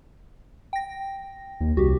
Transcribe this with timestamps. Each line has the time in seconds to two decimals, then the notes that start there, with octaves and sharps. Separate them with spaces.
0.73 G5 A#6
1.61 D#2
1.77 C2 F#4 G4